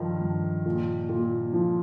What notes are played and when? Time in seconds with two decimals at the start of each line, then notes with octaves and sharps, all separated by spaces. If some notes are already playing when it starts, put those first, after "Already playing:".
Already playing: G2 D#3 F3
0.21 G2
0.65 A#2
1.09 A#2
1.53 F3